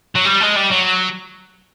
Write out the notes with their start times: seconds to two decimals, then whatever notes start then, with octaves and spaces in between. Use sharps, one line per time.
0.16 F#3
0.26 G3
0.41 G#3
0.56 G3
0.71 F#3